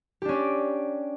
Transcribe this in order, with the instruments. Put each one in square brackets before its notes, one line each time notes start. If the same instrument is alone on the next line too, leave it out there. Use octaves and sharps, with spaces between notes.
[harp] G4
D4
C#4
D5